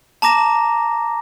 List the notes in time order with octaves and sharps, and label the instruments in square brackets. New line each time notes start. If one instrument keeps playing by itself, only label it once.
[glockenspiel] A5 A#5 D6 A#6 E7